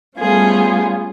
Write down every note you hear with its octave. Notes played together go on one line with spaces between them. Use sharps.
G3 A3 B3 C#4 F4 G#4